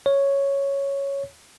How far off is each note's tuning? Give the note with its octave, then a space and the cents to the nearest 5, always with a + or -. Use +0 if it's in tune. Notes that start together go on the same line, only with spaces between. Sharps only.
C#5 +0